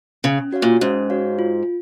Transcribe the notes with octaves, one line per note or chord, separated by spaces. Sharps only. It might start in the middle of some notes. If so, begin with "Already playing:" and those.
C#3 C#4
F#4 C#5 F5
A#2
G#2 C#4
F#4 C#5 F5
F4